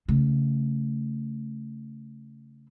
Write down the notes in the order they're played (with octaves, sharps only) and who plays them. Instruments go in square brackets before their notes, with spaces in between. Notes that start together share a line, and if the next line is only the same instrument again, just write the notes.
[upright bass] C#3 A3